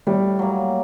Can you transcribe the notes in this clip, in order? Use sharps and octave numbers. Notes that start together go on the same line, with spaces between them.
A2 G3
F#3 A#3